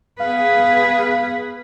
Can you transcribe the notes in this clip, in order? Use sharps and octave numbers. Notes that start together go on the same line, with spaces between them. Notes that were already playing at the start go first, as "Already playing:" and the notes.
B3 G#4 B4 F5